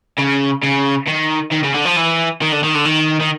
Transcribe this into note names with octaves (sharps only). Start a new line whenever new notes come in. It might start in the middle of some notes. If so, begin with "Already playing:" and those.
C#3
C#3
D#3
D#3
C#3
D3
F3
E3
D#3
D3
D#3
D3
D#3
D#3